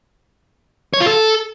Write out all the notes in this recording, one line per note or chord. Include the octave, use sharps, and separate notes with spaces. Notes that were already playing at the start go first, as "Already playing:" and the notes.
C#5
F4
A4